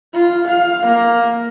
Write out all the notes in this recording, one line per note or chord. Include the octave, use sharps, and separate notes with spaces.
F4
F5
A#3